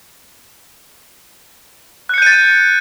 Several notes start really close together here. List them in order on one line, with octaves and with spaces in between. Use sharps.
F#6 C#7 G6 D#7 A6